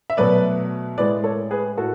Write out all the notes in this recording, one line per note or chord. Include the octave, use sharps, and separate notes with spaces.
E5
B2 F#3 A3 B4 D5
A2 G#3 B4 D5
A4 C#5
G#4 B4
A2 F#4 A4